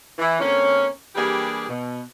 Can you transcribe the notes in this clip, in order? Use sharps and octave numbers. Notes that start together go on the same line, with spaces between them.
E3
D3 A#3 C4 C#4
E3 G3 A#3 D4 G4 G#4
B2